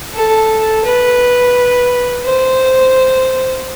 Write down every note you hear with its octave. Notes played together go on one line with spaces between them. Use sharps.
A4
B4
C5